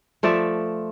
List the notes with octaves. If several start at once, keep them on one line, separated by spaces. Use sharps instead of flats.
F3 A3 D5 E5